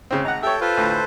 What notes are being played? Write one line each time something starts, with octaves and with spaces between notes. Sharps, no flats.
C#3 C4
G#1 F#5 A#5
G4 A4 C#5 E5 G5
F4 A4 B4 C5
D2 A2